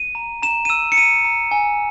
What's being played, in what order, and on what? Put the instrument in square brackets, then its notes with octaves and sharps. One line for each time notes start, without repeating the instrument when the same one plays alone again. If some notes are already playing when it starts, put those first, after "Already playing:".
Already playing: [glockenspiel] D#7
A#5
A#5 E7
D#7
E6 E7
C#7
A#5 D#7
A#5
G#5